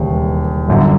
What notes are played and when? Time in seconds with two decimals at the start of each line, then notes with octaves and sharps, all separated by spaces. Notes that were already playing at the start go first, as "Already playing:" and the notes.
Already playing: E1 D#2 C#3 E3 G3
0.68 G1 F#2 D3